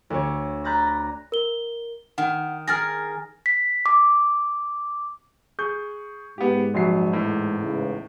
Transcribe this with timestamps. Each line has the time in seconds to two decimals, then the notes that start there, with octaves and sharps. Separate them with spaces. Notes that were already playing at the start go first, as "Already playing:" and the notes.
0.10 D2 C#5
0.64 A#5 B5 F#6 G6 A6 A#6
0.87 A#6
1.32 A#4 G7
2.18 D#3 F#5
2.68 G#4 A#4 F6 A6 A#6
3.46 B6
3.86 D6
5.59 G#4 C#6 G6
6.38 G#2 B3 G4
6.74 A#1 F#3 C7
7.12 E2 A2
7.61 G#2 C#3 E3